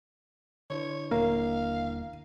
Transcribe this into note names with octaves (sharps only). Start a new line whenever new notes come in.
D3 D4 E4 C#5
D#1 A#2 A#3 A#4 F5